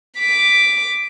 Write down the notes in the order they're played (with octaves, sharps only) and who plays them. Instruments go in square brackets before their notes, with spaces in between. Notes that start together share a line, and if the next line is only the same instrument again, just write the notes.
[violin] D6 B6